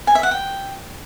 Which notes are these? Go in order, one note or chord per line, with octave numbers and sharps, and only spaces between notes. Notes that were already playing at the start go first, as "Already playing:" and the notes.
G#5
E5
F#5
G5